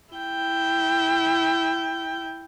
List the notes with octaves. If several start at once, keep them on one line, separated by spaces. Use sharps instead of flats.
E4 G5